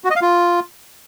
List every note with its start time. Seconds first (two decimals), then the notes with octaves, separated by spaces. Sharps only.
0.04 F#4
0.10 D#5
0.16 F5
0.22 F4